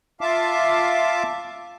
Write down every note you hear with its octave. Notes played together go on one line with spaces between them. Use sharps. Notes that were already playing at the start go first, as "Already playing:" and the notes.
F4 E5 F5 A5 D6